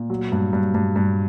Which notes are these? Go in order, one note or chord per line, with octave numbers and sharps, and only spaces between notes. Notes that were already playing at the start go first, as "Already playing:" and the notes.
Already playing: A#2
F#3
G2
G2
G2
G2